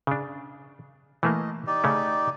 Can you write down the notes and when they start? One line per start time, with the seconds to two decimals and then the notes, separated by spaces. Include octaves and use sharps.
0.07 C#3 D4
1.23 E3 A3 A#3 D#5
1.67 D#4 G4 D5
1.84 C#3 A3 C#4